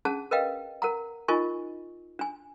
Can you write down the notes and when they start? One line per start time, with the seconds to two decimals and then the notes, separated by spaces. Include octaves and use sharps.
0.05 C#4 D4 G#4 F#5 A5
0.31 A#4 B4 D#5 F5 G5
0.82 A#4 F#5 A#5
1.28 D#4 F4 A#4 D#5 G#5 C#6
2.19 D4 G#5